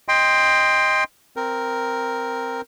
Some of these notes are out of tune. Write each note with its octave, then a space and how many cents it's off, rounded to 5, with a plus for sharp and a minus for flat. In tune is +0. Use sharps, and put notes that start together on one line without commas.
D#5 +0 G5 +20 C6 +0
C4 +0 A#4 +0